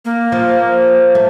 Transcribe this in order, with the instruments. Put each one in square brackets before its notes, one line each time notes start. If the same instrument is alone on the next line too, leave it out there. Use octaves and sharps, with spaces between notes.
[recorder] A#3
[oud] F3
A3